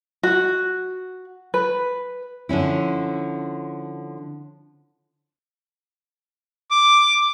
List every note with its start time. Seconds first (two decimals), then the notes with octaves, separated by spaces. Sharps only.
0.23 F#4
1.54 B4
2.49 D3 F3 C#4 E4
6.71 D6